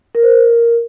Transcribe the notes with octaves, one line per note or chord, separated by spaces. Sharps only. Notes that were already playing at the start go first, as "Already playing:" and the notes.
A#4
C5
A#4